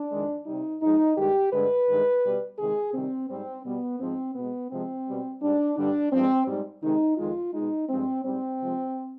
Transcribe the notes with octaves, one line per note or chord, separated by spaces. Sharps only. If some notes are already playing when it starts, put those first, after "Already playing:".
Already playing: D4
F2 D#3 G#3
C3 G3 D#4
G#2 F3 G#3 D#4
G2 D#3 G#3 G4
G2 D3 G#3 B4
G2 D#3 G#3
B2 G3
C3 D#3 G#3 G#4
C3 D#3 G3 C4
G#2 G3 C4
B2 G3 B3
G#2 F3 G#3 C4
B2 G#3 B3
C3 F3 G#3 C4
B2 G3
G#2 G3 D4
G2 D3 G3 D4
G2 F3 G#3 C4
G#2 G3
C3 D#3 G#3 D#4
F2 D#3 G#3 F4
B2 G#3 D#4
G2 F3 G#3 C4
G#2 G3 C4
C3 F3 G#3